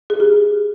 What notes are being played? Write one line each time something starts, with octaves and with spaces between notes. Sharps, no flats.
G#4
G4